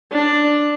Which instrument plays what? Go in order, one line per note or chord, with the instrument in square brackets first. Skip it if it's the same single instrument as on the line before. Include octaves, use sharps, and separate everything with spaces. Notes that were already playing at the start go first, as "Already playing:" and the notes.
[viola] D4